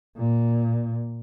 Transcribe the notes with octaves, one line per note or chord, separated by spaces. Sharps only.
A#2